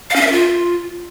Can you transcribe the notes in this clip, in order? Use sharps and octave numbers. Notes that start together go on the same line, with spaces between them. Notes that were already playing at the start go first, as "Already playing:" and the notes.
F5
C#4
E5
A#4
F4